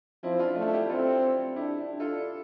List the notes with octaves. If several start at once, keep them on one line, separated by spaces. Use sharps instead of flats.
F3 C4 E4
D4 F4
A3 D4 F4
E4 G4
C4 F4 A4
D4 E4 G4
D4
F4 A4